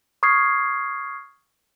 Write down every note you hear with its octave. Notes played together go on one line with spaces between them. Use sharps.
C#6 D#6 F6 G#6 C7